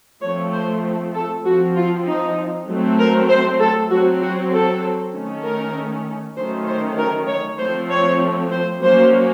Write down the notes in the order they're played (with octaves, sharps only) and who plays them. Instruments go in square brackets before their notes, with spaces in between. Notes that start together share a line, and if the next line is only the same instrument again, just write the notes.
[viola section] F3 A3 C4 C#5
C5
A4
F3 C4 F#4
F4
D#4
F#3 A3 C4
A#4
C5
A4
F#3 C4 F#4
F#4
A4
D#3 A3 C#4
A#4
D#3 F#3 A3 C#4 C5
C5
A#4
C#5
F3 A3 C4 C5
C#5
C5
F#3 A#3 C#4 C5